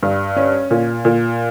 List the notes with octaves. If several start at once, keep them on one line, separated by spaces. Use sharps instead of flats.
G2
C#4
A#2
A#2